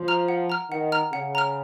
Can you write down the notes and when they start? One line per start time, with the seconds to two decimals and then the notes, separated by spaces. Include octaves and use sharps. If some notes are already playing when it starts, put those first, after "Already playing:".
Already playing: F3
0.08 A#5 F6
0.28 F#5
0.50 A#5 F6
0.71 D#3 F#5
0.92 A#5 F6
1.13 C#3 F#5
1.35 A#5 F6